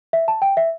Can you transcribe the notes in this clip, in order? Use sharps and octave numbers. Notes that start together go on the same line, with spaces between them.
E5
A5
G5
E5